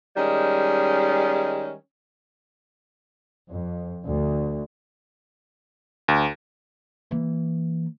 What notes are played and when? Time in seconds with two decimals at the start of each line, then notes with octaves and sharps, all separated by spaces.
0.17 D#3 G3 G#3 C#4
3.49 F2
4.07 D2
6.08 D2
7.11 E3 A#3